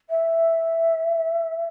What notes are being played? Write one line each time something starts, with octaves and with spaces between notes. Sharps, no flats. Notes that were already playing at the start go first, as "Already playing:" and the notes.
E5